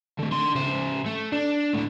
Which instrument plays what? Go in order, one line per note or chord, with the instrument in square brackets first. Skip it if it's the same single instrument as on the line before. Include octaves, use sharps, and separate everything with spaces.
[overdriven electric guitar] A2 D3
D3 C6
C#3 C5
A3
D4
A2 D3